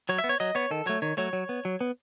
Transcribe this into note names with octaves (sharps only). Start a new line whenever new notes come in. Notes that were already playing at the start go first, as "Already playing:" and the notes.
F#3 C#5
E5
B3
C#5
F#3 D#5
B3 C#5
D#3 A4
F#3 A3 C#5
D#3 C#5
F#3 A3 C#5
F#3
B3
F#3
B3